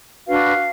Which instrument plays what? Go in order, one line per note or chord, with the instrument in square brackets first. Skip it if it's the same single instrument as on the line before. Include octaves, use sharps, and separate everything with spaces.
[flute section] D4 F#4 B4 F5